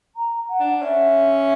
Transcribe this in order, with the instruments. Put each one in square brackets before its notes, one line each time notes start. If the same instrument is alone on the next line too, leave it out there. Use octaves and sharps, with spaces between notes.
[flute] A#5
F#5
[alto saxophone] D4
[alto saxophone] C#4 [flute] E5